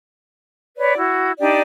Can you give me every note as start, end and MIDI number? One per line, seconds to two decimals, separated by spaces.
0.77 0.96 71
0.77 0.96 73
0.77 0.96 74
0.97 1.32 64
0.97 1.32 66
1.39 1.62 62
1.39 1.62 63
1.39 1.62 67
1.39 1.62 74